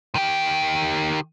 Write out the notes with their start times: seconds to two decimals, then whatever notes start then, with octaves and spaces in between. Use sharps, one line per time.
0.15 D#3 G4